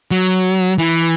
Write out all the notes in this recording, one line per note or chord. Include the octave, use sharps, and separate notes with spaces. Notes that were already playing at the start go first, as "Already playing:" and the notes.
F#3
E3